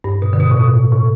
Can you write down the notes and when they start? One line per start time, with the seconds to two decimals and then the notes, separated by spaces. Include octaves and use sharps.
0.04 G2
0.22 B2
0.33 D3
0.40 B2
0.51 A2
0.57 B2
0.74 A2
0.92 A2